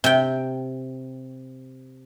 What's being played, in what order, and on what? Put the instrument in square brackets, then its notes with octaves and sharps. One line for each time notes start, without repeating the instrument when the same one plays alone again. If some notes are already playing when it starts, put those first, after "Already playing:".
[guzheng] C3 G5